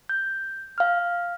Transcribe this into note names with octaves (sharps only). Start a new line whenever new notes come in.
G6
F5 F6